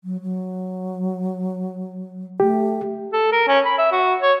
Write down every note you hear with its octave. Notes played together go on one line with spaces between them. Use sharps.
F#3
F#3
A3 G4
A4
A#4
C#4
B5
E5
F#4
C#5